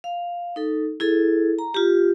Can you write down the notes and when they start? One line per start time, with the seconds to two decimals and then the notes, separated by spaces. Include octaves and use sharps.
0.04 F5
0.56 D#4 A4
1.00 E4 G#4 A4
1.59 A#5
1.74 F4 G4